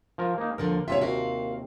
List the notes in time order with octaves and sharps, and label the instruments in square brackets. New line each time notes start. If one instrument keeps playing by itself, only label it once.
[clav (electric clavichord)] F3 A#4
A#3 D#4
[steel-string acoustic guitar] D#2 D3 F3 [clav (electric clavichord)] A#4
[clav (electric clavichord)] D#2 C3 F4 [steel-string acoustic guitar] C#5 D#5 E5
[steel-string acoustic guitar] F#4 A#4 F5